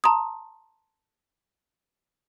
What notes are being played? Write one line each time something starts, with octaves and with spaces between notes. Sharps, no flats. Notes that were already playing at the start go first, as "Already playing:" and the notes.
A5 A#5 C6 D#6